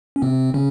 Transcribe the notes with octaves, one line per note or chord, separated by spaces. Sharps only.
C#4
C3 C4
C#3 C#4